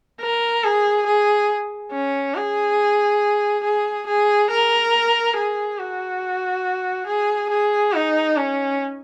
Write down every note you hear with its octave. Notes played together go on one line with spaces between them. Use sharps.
A#4
G#4
G#4
C#4
G#4
G#4
G#4
A#4
G#4
F#4
G#4
G#4
D#4
C#4